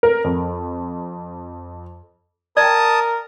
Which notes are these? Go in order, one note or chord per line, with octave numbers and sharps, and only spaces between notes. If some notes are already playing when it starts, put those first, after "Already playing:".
A#4
F2
A#4 D5 G5 A5 D#6